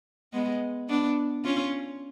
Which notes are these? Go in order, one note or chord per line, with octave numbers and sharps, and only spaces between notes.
G#3 B3
B3 D4
C#4 F4